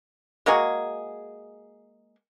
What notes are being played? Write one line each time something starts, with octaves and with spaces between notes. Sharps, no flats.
G#3 A#3 F#4 G#4